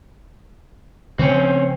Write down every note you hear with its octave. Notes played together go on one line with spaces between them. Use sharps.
C#3 F3 A3 C4 C#4